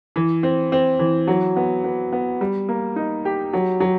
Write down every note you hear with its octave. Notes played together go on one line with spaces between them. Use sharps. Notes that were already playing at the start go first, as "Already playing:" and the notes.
E3
C4
C4
E3
F#3
B3
B3
B3
G3
A#3
D#4
G4
F#3
F#3